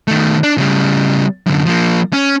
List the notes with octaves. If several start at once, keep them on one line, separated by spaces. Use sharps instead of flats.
D#3 A3
D4
C#3 G3
F#2 D3
F3 A#3
C#4